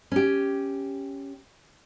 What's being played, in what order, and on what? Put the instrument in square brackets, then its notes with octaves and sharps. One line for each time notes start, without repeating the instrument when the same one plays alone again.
[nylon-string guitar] C#4 G4